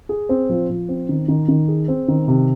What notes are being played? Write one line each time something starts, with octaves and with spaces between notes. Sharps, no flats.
G#4
C4
F3
F3
C4
D#3
D#3
D#3
G#4
C4
D#3
C3